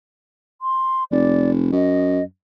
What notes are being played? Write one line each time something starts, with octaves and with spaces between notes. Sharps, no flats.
C6
F1 D5
F#2 D#5